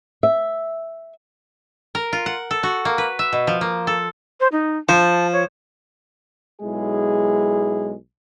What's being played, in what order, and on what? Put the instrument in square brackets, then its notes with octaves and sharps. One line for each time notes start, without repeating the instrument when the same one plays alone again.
[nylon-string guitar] E5
[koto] A#4
F4
F#5
A4
F#4
A#3
B4
E5
B2
F3
A#3
A4
[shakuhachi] C5
D#4
[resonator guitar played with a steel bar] F3 [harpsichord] C5 [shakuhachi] A5
[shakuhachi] C#5
[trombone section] B1 G#3 E4 G#4